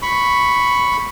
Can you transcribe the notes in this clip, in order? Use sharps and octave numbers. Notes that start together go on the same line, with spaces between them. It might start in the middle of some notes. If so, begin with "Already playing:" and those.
B5 C#6